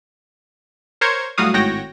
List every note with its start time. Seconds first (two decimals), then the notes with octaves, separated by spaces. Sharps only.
1.01 A#4 C5 C#5 C#6 G#6
1.38 A2 F#3 G3 F#4 F5 D#6
1.54 G#1 A2 F#4 C#5 G5 A#6